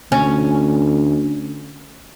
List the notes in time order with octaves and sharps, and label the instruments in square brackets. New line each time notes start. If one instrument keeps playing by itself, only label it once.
[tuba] D2 [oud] C#4